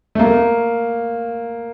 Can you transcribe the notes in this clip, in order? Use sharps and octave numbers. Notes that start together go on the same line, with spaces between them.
A3
A#3